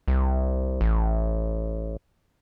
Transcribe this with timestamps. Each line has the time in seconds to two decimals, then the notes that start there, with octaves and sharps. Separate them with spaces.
0.08 C2
0.81 A1